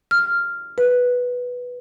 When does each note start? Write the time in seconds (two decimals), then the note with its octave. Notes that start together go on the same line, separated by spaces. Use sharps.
0.11 F6
0.78 B4